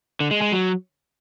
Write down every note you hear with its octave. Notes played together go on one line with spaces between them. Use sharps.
D3
G#3
G#3
F#3